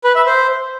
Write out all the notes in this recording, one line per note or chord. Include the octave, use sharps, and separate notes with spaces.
B4
E5
C5